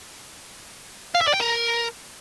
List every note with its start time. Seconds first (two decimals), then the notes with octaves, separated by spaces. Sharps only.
1.15 F5
1.21 E5
1.28 D5
1.34 G5
1.40 A#4